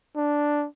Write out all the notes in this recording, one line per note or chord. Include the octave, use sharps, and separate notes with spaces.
D4